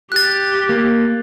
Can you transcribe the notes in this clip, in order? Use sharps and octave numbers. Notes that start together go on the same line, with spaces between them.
G4 F#6 A6
A#3